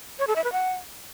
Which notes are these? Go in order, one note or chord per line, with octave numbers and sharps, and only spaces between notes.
C#5
A4
E5
B4
F#5